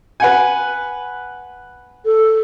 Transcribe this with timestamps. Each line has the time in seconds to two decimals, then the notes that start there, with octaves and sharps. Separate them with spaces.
0.20 B4 F#5 G#5
2.05 A4